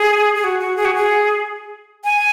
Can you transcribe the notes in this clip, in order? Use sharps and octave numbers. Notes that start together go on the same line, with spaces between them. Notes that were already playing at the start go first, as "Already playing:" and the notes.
Already playing: G#4
G#4
F#4
F#4
G#4
F#4
G#4
G#5